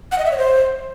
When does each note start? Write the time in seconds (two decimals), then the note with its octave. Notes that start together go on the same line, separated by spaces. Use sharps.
0.12 F#5
0.18 D#5
0.25 E5
0.31 C#5
0.38 C5